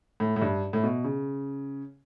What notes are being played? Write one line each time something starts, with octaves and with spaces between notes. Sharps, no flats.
A2
A2
G2
A2
B2
C#3